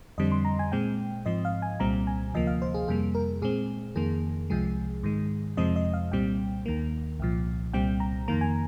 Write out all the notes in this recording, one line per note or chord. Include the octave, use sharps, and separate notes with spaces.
F2 D3 G3 C4 D#5
C6
A#5
G#5
A#2 G#3 C4 G5
G#2 F3 C4 D#5
F5
G#5
C2 A#2 G3 C4 A#5
G#5
D2 C3 F3 A#3 D#5
F5
C5
G#4
F2 C3 G3 A#3 G#4
A#4
A#2 G#3 C4 G#4
F2 D#3 A#3 G#4
C2 C3 F3 G#3 G#4
G#2 D#3 G#3
F2 C3 F3 G#3 C4 D#5
D#5
F5
C2 A#2 G3 C4 G5
D#2 D#3 A#3
C2 A#2 F3
C2 A#2 G3 C4 G5
A#5
F2 D#3 A#3 A#5
G#5